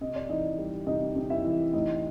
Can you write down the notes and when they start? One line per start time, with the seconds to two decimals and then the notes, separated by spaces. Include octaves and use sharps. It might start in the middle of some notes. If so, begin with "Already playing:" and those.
0.01 C3 D#5
0.15 D5
0.29 E3 D#4 D#5
0.58 G3
0.87 C3 D#4 D#5
1.16 C3
1.30 E4 E5
1.45 E3
1.73 A2 D#4 D#5